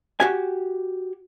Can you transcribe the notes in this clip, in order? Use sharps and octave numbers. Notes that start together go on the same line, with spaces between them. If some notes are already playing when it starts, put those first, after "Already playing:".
F#4 G4 G#5